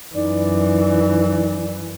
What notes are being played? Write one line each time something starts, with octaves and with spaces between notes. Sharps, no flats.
F#2 E3 D#4 D5